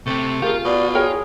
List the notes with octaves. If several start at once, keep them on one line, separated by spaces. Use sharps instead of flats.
C3 A3 C4
F4 G4 G#4 A#4
B2 D5
G#4 A#4 C#5 G5